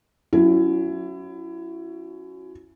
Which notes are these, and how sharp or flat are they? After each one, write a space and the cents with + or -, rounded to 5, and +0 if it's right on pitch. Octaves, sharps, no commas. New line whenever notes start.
F#3 +0 C#4 +10 E4 +25